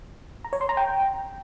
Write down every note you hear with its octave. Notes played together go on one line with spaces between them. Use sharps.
A#5
C#5
C6
A#5
G5